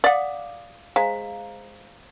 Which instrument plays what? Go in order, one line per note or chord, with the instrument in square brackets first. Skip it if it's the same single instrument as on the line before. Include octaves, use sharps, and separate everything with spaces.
[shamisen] D5 F#5 [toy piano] F5 D6 D#6
[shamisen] G#3 [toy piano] C5 F5 A#5